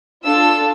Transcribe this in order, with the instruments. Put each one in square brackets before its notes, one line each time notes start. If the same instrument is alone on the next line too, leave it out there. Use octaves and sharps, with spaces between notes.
[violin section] D4 F4 A4 E6